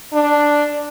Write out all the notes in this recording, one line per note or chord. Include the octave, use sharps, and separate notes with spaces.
D4